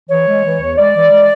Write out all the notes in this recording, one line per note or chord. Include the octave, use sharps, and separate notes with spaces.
E3 C#5
G#3
E3
E2
G#3 D5
E3
G#3